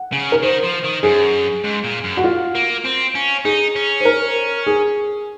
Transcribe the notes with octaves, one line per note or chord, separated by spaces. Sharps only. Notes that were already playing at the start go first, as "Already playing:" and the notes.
Already playing: F#5
C#3
A#4
D#3 C5
F3
D#3
F#2 G#4
G#2
A#2
F#2
F#4
F4
A#3
C4
C#4
D#4 G#4
C#4
C5
A#4
G#4